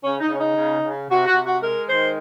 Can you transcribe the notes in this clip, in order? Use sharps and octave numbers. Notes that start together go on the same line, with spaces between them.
C#3 C#4
D#4
C#3 C#4
D#4
C#3
C#3
C3 F#4
F#4
C3
F#4
G#3 A#4
D#3 C5